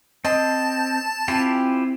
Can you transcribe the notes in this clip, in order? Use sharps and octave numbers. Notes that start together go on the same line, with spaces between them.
C4 D#5 A5 C6 A6
C4 E4 F4 G4 G#5